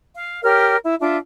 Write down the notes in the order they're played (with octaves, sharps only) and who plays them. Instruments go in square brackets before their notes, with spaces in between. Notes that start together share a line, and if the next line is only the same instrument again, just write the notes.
[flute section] F5
G4 A#4 C#5 F6
E4
D4 F4 E5